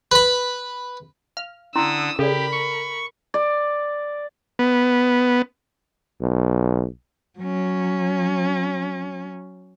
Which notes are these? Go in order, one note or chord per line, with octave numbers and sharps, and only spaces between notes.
B4 B5
F5 F6
D3 C#4 E4 C6 D#6 E6
C#3 G4 A4 A#4 D5 B5
C#6
D5
B3
B1
F#3 C#4